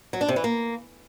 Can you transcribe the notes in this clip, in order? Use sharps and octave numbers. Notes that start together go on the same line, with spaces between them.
F#3
D4
C3
E3
A#3